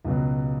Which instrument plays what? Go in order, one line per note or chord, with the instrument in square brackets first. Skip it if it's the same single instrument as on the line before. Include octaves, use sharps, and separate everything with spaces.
[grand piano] C#2 B2 F#3